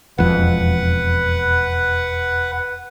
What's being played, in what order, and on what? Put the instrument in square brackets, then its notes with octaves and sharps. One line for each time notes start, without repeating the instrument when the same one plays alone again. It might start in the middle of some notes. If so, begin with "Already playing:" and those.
[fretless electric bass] E1 F2 [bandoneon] B4 F#5